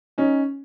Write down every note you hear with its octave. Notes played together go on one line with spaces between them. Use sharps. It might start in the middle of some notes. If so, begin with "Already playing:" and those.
C#4 D#4